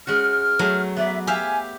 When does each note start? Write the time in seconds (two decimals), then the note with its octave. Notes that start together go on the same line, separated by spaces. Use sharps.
0.07 G#3 C#4 F#4 F6
0.59 F#3 A3 G#4
0.96 B3 D5 E5
1.27 G4 E5 F5 G#5